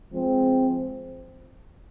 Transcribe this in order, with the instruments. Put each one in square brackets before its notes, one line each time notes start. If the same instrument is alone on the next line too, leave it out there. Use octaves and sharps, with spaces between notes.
[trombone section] F3 G#3 C4